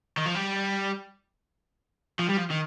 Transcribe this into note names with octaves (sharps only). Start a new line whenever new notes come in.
D#3
F3
G3
F3
G3
F3
D#3